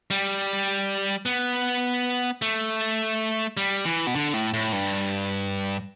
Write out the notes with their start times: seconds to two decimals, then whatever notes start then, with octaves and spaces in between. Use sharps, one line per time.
0.11 G3
1.26 B3
2.42 A3
3.57 G3
3.86 E3
4.07 B2
4.15 D3
4.33 A2
4.54 A2
4.72 G2